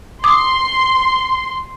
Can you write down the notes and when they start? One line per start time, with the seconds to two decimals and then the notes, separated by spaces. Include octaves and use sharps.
0.24 C6 D6 D#6